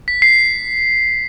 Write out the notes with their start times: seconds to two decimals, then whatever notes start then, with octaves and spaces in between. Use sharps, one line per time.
0.08 B6
0.22 C7